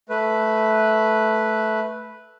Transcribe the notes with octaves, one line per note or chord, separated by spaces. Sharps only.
A3 B4